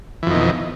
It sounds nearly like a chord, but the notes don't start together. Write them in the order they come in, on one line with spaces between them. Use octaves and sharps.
E3 F2 D#3 B2